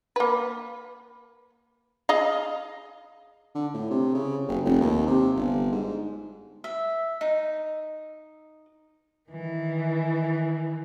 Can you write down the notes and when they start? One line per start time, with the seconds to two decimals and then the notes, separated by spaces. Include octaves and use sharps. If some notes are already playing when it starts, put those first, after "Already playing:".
0.16 A#3 B4
2.09 G#4 D#5 F5
3.55 D3
3.74 A2
3.90 C3
4.14 C#3
4.48 F#1
4.64 F1
4.81 D#2
5.06 C3
5.36 G1
5.72 G#2
6.64 E5
7.21 D#4
9.30 D#3 E3